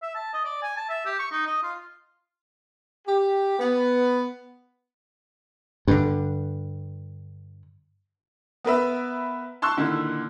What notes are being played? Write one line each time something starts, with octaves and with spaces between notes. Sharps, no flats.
E5
A5
D#5
D5
G#5
A5
E5
G4
C#6
D#4
D#5
F4
G4
B3
G2 D3
B3 A#4 B4 E5
A5 C6 C#6 E6 F#6
A#2 D3 D#3 E4